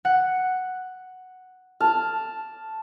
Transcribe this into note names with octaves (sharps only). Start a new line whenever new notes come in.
F#5
A5 D6 F6